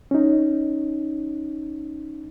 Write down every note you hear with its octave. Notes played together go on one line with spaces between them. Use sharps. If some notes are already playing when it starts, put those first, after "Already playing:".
C#4 D#4